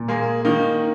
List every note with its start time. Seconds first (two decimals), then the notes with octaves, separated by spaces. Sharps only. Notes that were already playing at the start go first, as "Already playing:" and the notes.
Already playing: A#2
0.08 G#3 A#3 G#4
0.45 D#3 A#3 D#4